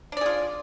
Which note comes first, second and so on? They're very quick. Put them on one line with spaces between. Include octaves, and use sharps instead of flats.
D4 D5 G#4 F4